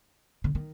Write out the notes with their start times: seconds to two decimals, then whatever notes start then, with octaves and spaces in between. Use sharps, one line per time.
0.44 D3
0.55 D#3